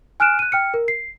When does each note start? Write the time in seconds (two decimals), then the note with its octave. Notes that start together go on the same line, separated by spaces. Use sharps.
0.20 G#5 F6 F#6 D7 E7
0.39 F#6 D#7
0.52 G5 F6 C#7
0.74 A#4
0.88 C7